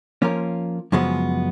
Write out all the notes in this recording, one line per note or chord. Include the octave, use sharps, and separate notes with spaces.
F3 A#3 C#4 F4 A#4
F#2 C#3 F3 G#3 B3